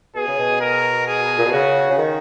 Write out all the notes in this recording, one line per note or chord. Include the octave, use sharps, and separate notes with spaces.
B2 G#4
C#3
B2
A#4
G#4
A#2
B2
C#3 F#4
C#3
D#3